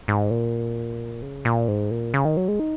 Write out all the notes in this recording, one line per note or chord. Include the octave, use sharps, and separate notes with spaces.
G#2
A#2
C#3
A#2
G#2
A#2
C#3
D#3
F#3
G#3
D#4